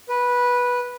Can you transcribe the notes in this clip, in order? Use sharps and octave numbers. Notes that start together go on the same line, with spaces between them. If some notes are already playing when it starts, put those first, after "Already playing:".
B4